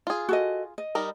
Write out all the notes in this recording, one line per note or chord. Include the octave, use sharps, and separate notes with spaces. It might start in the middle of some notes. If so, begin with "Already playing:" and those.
F4 G#4
F#4 A4 D#5
D#5
G3 D#4 A#4